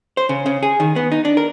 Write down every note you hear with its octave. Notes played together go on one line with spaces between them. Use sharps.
C5
C#3
C#3
G#4
D#3
B3
D#4
D4
A#4